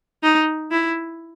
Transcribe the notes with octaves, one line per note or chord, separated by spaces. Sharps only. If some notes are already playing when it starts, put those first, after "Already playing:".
D#4
E4